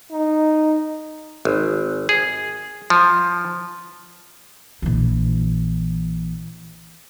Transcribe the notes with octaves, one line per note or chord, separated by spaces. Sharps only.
D#4
G#1
G#4
F3
A#1 E3